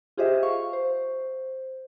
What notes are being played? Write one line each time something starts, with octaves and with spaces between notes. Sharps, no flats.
F4 G4 G#4 C5 D#5 E5
F5 C#6
C5